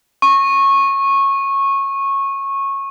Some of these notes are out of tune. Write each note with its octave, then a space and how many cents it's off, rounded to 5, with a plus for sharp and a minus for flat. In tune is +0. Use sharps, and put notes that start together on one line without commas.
C#6 -15